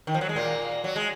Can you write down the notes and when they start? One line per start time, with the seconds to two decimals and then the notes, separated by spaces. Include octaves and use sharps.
0.07 D#3
0.14 F3
0.21 F#3
0.29 G#3
0.36 A#2 A#3
0.84 F#3
0.96 G#3